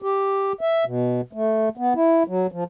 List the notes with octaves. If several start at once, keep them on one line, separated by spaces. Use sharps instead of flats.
G4
E5
B2
A3
B3
E4
F#3
F3